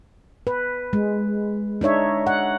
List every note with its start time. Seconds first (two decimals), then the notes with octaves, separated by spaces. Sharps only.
0.47 B4
0.93 G#3
1.81 D4 D#4 C#5 E5
2.27 F#5